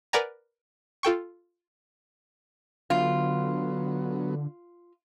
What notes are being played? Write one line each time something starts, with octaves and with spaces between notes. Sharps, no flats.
A#4 B4 D5 F#5 G#5 A#5
F4 A4 G5 C#6
D3 F#3 B3 F4